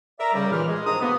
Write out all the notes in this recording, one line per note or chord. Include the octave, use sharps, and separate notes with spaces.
A#4 D5 E5 A#5
C#3 G3
D#2 A#2 E3 F6
G#3
G#2 C3 D#3 D4 A#5 D#6
B2 A#3 B3